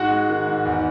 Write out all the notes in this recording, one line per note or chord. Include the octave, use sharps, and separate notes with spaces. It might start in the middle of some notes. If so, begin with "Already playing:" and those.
Already playing: G#2 G#3 F#4 F#5
G#3
D#3
G#2
E2